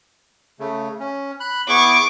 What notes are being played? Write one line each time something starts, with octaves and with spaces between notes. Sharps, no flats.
C#3 A3
C#4
B5 F#6
B3 E4 G#4 C#6 D6